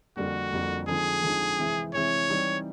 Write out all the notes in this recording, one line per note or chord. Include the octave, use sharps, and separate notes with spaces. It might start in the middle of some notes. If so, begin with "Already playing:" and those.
F2 D3 G3 A#3 F#4
F2 D3 G3 A#3
D3 F3 G#3 C4 D#4 G#4
D3 F3 G#3 C4 D#4
C3 E3 G#3 C4 E4
C3 E3 G#3 C4 E4 C#5
E3 G3 C4 D#4